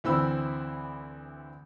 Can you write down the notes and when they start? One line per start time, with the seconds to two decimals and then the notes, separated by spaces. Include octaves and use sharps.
0.04 D2 E3 C4 B5 E6